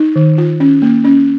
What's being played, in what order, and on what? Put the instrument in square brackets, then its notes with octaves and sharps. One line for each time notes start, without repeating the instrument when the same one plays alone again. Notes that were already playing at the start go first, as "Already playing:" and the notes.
Already playing: [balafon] D#4
D#3
F4
C#4
A#3
C#4